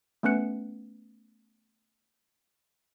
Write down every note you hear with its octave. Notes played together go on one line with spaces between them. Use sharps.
A3 B3 C#4 B4 F#6 C#7